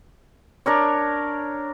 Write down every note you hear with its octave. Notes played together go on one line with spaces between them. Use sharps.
D4 A#4 C#5